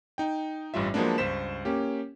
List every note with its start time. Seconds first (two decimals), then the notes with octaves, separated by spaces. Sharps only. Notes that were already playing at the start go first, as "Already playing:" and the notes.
0.18 D#4 G5
0.74 A1 G2 G3 F4 E5
0.94 F3 F#3 G#3 A#3 B3 D4
1.18 C#2 G2 C5 B6 E7
1.65 A#3 C#4 G4